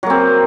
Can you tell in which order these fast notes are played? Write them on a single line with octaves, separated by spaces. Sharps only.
F#3 A#3 C4